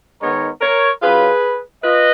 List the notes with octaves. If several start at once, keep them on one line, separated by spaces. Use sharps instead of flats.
D#3 G#3 B3 D#4 A#4 C#5
A#4 C#5
F#3 C#4 F4 G#4 B4
F4 B4 D#5